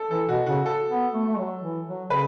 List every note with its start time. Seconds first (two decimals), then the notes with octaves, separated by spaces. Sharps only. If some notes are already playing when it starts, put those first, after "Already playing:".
Already playing: A4
0.11 E3 A4
0.29 B2 F#4
0.46 C#3 F#4
0.66 A4
0.89 B3
1.14 A3
1.26 A3
1.38 F#3
1.62 E3
1.87 F#3
2.10 C#3 B4